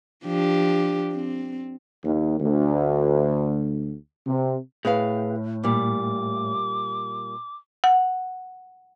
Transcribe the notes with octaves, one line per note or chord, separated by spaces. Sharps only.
F3 D4 G4
C4
D#2
D2
C3
A2 G#4 B4 F5
A#2 G3 D6
F#5